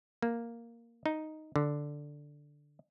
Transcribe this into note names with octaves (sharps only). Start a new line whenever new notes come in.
A#3
D#4
D3